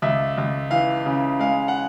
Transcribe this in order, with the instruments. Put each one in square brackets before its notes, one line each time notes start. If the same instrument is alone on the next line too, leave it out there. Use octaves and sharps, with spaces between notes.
[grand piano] C#2 E5
C#2
E3 F5
C#3
G#3 F5
F#5